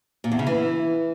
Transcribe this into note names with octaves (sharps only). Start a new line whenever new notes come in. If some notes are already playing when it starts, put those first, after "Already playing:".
A#2
E2
C#3
E3